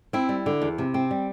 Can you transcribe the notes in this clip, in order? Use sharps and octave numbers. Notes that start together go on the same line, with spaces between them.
C4 E4
G3
D3
E2
C3
C4
G3